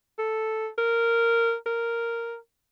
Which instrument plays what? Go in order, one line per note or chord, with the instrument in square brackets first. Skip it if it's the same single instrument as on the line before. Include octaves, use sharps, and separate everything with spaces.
[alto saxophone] A4
A#4
A#4